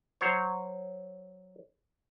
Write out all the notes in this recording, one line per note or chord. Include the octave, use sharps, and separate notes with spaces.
F#3 C5 C#5